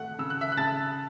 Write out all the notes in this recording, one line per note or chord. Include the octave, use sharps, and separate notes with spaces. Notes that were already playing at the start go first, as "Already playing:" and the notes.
Already playing: A3 F#5 F#6
C#3 E6
F#6
E5 E6
F#6
C#3 A5 A6